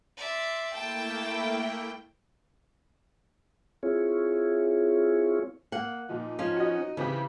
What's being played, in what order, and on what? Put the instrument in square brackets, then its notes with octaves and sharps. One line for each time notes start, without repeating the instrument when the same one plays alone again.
[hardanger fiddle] D5 E5 [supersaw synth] C6
[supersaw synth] A3 A#3 E4 [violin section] G5 [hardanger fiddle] A5
[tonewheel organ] C4 E4 F4 G#4 C#5
[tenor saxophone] A#3 [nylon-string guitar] F#5
[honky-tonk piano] A#2 F3 [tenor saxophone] D#4
[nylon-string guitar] F3 C#4 [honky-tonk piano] F5
[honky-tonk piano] F#4 D#5
[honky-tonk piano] C#3 C4 G4 [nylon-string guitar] E3